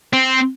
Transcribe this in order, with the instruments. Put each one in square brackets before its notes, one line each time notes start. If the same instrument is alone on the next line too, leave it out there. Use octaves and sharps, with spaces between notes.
[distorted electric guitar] C4